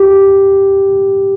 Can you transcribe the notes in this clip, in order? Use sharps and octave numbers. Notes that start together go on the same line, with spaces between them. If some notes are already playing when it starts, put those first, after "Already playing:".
Already playing: G4